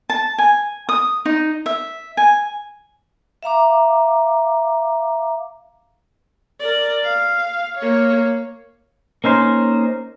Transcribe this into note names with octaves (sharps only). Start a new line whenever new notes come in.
A5
G#5
D#6
D#4
E5
G#5
E5 F5 A#5 D6
A#4 D5
F5
A#3 C#5
A#3 C#4 D#4 C5